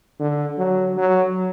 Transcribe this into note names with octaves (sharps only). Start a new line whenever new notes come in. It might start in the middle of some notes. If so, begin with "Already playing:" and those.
D3
F#3
F#3